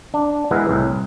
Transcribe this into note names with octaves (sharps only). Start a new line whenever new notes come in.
D4
E3 G#3 B3 E4 A#4 B4
C2 A2